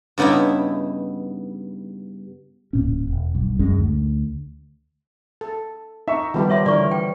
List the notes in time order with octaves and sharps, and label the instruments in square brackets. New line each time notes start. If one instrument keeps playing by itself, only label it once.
[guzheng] G2 C#3 B3 D#4 E4
[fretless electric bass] D1 A#2 C#4
E1
B1 G2
A#1 F#2 G#3 C#4
D2
[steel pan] A4
[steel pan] D#4 [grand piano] E5 C#6
[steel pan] D#3 B3 G4 [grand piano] F3 G3
[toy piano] C#5 E5 C6
[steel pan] D3 E3 A#4 [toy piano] D5 C#6
[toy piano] G5